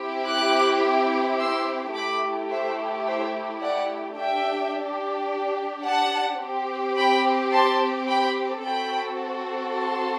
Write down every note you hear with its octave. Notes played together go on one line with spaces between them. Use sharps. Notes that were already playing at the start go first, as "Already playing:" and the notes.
Already playing: C4 E4 G4
D6 F#6
C6 E6
A3 E4 G4 B5 D6
C5 E5
C5 E5
D5 F#5
D4 G4 E5 G5
F#5 A5
C4 G4
G5 B5
A5 C6
G5 B5
C4 F#4 A4 G5 B5
A5 C6